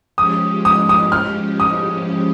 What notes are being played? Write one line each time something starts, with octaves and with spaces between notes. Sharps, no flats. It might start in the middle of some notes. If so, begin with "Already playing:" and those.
F3 G#3 C#4 G4 D#6
D#6
D#6
F6
D#6